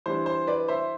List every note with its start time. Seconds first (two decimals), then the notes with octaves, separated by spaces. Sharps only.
0.06 E3 G3 D4 C5
0.26 C5
0.47 B4 D5
0.68 C5 E5